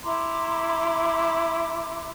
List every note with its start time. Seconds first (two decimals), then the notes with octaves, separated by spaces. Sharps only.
0.04 E4 A#5 C6 D6